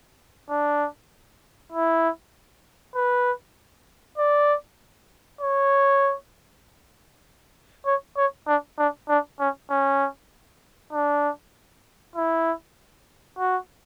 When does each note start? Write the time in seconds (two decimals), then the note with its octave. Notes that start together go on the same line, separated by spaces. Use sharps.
0.50 D4
1.73 E4
2.95 B4
4.18 D5
5.41 C#5
7.86 C#5
8.17 C#5
8.47 D4
8.78 D4
9.09 D4
9.40 C#4
9.70 C#4
10.93 D4
12.16 E4
13.39 F#4